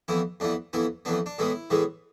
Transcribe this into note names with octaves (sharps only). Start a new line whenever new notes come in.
F2 E3 B3 E4
F2 E3 B3 D4
F2 E3 B3 E4
F2 E3 B3 D4
D4
A2 E3 G#3 B3 E4
A2 E3 G#3 B3